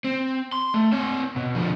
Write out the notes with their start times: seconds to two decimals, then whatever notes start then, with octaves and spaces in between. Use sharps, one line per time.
0.04 C4
0.53 C6
0.74 A3
0.92 C4 C#5
1.36 B2
1.55 D3 F3